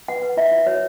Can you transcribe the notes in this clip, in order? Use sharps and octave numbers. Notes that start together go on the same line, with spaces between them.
B4 F#5
B4
E4 E5
E4
F#4 C#5